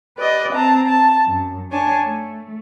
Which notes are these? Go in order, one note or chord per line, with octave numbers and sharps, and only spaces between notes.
G4 B4 D5 D#5
C4 A5 A#5
A5
F#2
D4 C#5 G#5 A5
A3